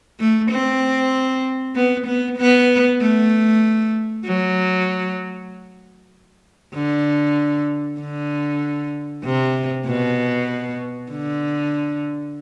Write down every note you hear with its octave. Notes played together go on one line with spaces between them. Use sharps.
A3
C4
B3
B3
B3
A3
F#3
D3
D3
C3
B2
D3